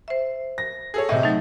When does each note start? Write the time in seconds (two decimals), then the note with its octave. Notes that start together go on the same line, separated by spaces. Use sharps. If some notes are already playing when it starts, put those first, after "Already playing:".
0.08 C5 E5
0.58 A#6
0.94 G#4 A4 C#5
1.09 A2 C3 D#5 E5
1.23 F#3 A3 D#4